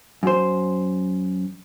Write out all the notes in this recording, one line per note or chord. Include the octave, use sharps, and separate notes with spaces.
F#2 C5